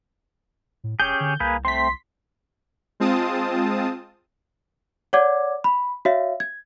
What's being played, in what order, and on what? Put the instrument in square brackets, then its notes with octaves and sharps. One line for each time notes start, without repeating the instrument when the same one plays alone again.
[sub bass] A2
[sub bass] E1 [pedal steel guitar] C#4 G4 G#4 [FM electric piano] G6
[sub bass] D3
[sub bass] C2 [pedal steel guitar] A#3 G#4 B4
[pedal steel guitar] A3 C4 [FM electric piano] C6 B6
[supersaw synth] G#3 C4 F4 A5 D#6
[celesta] C#5 D5 F#5 D6 G#6
B5
F#4 C#5 E5 F5
G#6